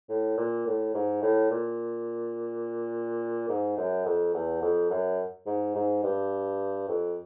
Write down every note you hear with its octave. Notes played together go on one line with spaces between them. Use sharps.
A2
A#2
A2
G#2
A2
A#2
G#2
F#2
F2
E2
F2
F#2
G#2
G#2
G2
F2